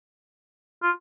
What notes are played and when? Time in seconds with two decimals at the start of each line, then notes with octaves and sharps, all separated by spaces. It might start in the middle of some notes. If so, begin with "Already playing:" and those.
0.83 F4